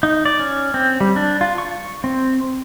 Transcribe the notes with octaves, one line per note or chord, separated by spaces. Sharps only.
D#4
D5
C#4
C4
G3
D4
F4
C#6
C4